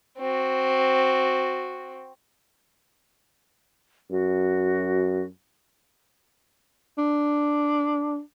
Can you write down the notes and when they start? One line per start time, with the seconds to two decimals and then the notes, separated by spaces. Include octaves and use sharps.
0.18 C4 F#4
4.11 F#2 F#4
6.98 D4